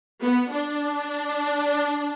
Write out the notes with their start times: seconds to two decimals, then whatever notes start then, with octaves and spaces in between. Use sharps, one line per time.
0.22 B3
0.51 D4